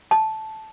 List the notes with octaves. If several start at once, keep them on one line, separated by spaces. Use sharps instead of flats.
A5